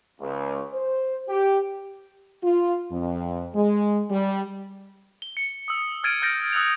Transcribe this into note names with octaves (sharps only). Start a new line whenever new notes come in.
C#2
C5
G4
F4
F2
G#3
G3
G7
C#7
D#6 E6
E6 F6 G#6 A6 D7 D#7
F6 G6 A6 A#6 D7
D#6 E6 F#6 D7 F7